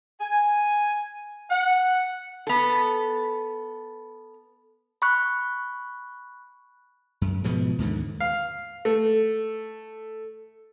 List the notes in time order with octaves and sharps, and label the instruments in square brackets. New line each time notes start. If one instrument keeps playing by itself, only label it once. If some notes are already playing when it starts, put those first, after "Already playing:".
[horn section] G#5
F#5
[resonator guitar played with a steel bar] B3 A4
[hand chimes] B5 C#6 F#6
[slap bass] F#2
G#2 B2 F3 B3
D#2 G#2 D3
[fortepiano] F5
A3